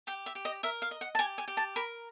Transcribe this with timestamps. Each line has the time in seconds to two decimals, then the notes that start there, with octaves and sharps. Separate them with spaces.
0.07 G4 G5
0.26 E5
0.35 G4
0.45 D#5
0.63 A#4 E5
0.82 F5
0.91 D#5
1.01 F#5
1.15 A5
1.19 G4 G#5
1.38 G#5
1.48 G4
1.57 A5
1.76 A#4 B5